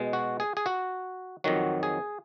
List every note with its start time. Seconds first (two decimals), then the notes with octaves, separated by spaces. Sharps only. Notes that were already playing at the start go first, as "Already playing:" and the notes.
Already playing: B2 G#3
0.13 F#4
0.40 G#4
0.57 G#4
0.66 F#4
1.44 F2 D#3 F#3 F#4
1.83 G#4